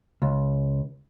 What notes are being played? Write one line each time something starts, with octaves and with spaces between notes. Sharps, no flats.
C#2